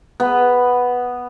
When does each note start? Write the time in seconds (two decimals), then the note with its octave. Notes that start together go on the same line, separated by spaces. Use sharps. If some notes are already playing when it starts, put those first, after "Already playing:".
0.20 B3